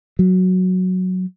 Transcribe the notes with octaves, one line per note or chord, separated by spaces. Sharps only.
F#3